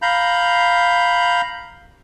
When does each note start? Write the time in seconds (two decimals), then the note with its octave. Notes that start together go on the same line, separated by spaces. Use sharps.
0.02 F5 A#5 B5 G6